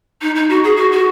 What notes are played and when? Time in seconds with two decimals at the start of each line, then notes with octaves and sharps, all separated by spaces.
0.21 D#4
0.35 D#4
0.49 F#4
0.64 G#4
0.77 F#4
0.92 F#4